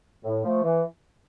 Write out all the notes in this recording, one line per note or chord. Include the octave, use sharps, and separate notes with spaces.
A2
F3 A3
E3